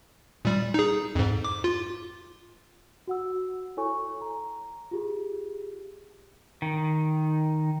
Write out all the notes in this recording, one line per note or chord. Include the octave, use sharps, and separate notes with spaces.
A#2 G3
D#4 G#4
F2 G#2
D6
F4
F#4 F#5 E6
E4 A4 C#5 G#5 C#6
A#5
F4 G4 G#4
D#3